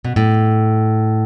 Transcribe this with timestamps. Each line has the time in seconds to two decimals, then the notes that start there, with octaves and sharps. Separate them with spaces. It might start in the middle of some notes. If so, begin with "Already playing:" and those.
0.04 B2
0.16 A2